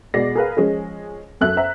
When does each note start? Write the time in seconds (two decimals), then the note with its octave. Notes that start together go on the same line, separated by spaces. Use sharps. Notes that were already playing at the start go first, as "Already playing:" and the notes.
0.14 B2 G#3 D5 A#6 C7
0.35 G#4 A#4 B4 F5
0.57 F3 G#3 C#4 G#4
1.41 F#2 A4 E5 F#6
1.57 C5 E5 A#5